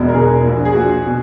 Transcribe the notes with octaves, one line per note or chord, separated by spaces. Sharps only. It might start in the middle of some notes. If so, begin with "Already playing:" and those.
Already playing: E1 E2 B2 F#4
A#4
E1 E2 B2 G#4
A#1 A#2
G#4
A#1 A#2 F#4
B2